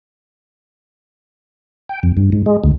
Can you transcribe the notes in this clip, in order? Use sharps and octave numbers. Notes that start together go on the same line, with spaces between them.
G5
F2
G2
G#2
G#3
D2